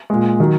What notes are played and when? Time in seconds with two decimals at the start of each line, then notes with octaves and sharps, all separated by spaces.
0.10 A#2 G#3
0.40 D#3 F#3